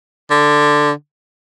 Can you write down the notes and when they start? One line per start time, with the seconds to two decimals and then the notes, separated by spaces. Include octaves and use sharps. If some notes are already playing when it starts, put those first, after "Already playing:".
0.31 D3